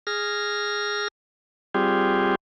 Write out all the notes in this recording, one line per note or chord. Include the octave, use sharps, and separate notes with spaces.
G#4 F6 A#6
G3 C4 F4 G4 G#4